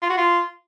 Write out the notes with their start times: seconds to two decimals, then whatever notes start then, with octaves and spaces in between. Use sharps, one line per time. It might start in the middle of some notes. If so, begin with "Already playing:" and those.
0.02 F4
0.10 F#4
0.17 F4